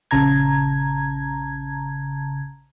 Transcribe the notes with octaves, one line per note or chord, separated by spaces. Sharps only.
A#1 C#3 A5 A#5 G#6